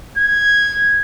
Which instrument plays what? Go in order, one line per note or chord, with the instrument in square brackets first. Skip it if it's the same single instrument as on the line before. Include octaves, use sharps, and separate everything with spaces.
[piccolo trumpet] G#6